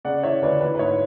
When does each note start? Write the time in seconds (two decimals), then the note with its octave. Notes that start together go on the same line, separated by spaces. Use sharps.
0.05 C#3 D5 F#5
0.23 E3 C#5 E5
0.42 D2 B4 D5
0.61 E3 B4
0.75 B4
0.79 G#2 C#5